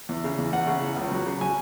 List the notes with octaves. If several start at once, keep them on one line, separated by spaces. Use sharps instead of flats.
E2
C#3
E2
E2 F#5
C#3
E2
C#2
F#3
C#3
F#3 G#5